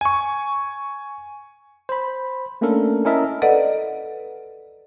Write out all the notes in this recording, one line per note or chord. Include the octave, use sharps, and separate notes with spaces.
G#5 C#6
C5 B5
A3 A#3 C#4 D4 A4 A#4
C#4 E4 A#4 D#5 E5 A5
A4 B4 D5 D#5 F#5